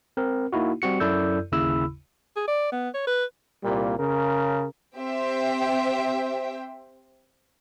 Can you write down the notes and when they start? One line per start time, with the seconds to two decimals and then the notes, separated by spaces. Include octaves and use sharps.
0.17 C4 A#4
0.53 A#3 D#4 E4 F#4
0.82 G3 C4 F#4 C#7
1.00 F#2 E4 A4 D5 E6 G6
1.52 G1 D#2 C#3 E4 B5 E6
2.36 G#4
2.48 D5
2.72 B3
2.94 C#5
3.07 B4
3.64 C2 A#2 G3 A#3
3.98 C#3 A#4
4.97 C4 G4 C5 E5 G5